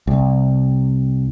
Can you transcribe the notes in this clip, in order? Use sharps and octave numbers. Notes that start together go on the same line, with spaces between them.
C2